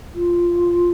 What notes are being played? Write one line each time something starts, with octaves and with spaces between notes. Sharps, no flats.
F4